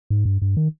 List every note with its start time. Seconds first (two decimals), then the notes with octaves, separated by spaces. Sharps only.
0.10 G#2
0.25 G2
0.42 G2
0.57 D#3